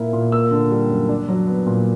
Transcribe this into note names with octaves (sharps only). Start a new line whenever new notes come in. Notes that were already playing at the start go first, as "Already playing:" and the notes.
Already playing: A#2 A#3 E4
A#2
A#3 E6
D3
G3
F#2
D4
F#3
B3
A#2